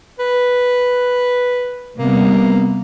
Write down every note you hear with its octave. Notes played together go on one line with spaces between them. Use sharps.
B4
C3 G3 A#3 B3